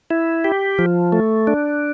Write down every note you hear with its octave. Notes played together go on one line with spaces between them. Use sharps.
E4
G4
F3
A3
D4